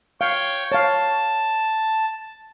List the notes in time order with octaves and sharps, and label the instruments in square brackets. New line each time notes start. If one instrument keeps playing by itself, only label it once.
[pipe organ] C#5 G5 [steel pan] F5
[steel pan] C#5 F5 [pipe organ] A5